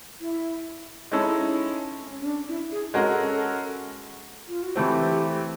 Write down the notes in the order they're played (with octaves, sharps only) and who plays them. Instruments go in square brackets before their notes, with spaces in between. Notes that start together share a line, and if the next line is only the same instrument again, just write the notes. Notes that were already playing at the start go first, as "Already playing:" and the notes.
[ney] E4
[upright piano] G#3 C#4 E4 A4 [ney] D#4
[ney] C#4
C#4
D4
E4
G#4
[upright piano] G#3 C#4 F#4 A#4 [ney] A4
[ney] F4
F#4
[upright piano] E3 A3 C4 [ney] G4